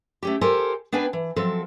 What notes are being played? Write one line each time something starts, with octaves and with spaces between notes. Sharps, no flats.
A3 C#4 G4
G4 A4 A#4 C5 G#5
B3 D4 B4 G5 G#5
E3
F3 F#3 C4 A4